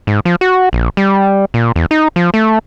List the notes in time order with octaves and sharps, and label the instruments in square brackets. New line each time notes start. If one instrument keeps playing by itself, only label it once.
[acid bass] G#2
F3
F#4
A#1
G3
A#2
E2
D#4
F3
A3